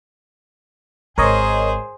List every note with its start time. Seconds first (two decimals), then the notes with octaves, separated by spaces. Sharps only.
1.18 G#1 G#4 A#4 C5 C#5 D#5